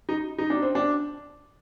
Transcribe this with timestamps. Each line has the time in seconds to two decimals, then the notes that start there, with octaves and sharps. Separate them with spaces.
0.09 D#4
0.38 D#4
0.50 D4
0.62 C4
0.75 D4